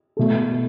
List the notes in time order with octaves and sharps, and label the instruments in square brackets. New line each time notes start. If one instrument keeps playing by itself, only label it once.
[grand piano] B2 A3 A4